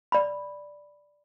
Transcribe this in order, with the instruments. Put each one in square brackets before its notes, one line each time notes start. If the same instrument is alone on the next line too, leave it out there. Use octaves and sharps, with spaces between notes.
[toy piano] D5 B5